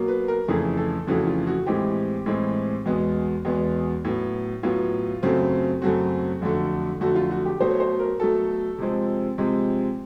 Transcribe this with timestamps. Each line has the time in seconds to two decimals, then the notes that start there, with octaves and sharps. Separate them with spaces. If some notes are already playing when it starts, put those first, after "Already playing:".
Already playing: B2 F#3 A#3
0.08 B4
0.28 A#4
0.48 F2 C#3 E3 A3 G#4
0.77 A4
1.07 F2 C#3 E3 A3 F#4
1.27 F4
1.47 F#4
1.66 A2 E3 G#3 C4 G4
2.26 A2 E3 G#3 C4
2.86 E2 B2 G#3 B3
3.45 E2 B2 G#3 B3
4.05 A2 F#3 B3
4.63 A2 F#3 B3 F4
5.23 F#2 C#3 F#3 A3 C4
5.82 F#2 C#3 F#3 A3 C4 F#4
6.42 F2 D3 F#3 A3
7.00 F2 D3 F#3 A3 F#4
7.15 F4
7.31 F#4
7.45 G4
7.60 B2 F#3 A3 C5
7.70 C#5
7.80 C5
7.99 A#4
8.20 B2 F#3 A3 A4
8.78 C3 F3 G#3 C4
9.38 C3 F3 G#3 C4